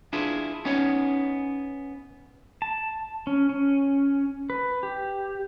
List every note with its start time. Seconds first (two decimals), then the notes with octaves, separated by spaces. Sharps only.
0.13 D4 E4 F4 G#4 B4
0.65 B3 C#4 D#4 C#5
2.62 A5
3.27 C#4
3.49 C#4
4.50 B4
4.83 G4